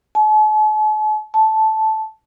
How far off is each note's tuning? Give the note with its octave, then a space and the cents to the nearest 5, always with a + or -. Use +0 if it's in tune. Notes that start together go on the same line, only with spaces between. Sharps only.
A5 -45
A5 -10